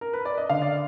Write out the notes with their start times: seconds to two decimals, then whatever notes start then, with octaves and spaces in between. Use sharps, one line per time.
0.01 A#4
0.13 B4
0.25 D5
0.38 D#5
0.49 D3 F5
0.62 D5